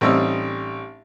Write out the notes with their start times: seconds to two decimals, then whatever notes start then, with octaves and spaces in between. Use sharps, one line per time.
0.01 A1 G3 C4 D#4 E6